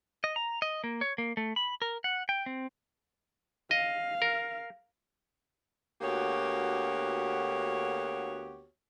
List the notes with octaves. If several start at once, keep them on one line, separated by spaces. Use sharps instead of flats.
D#5
A#5
D#5
A#3
C#5
A#3
A3
B5
A#4
F#5
G5
C4
D#5 F5
A#4
D2 A#3 B3 F#4 G4 C#5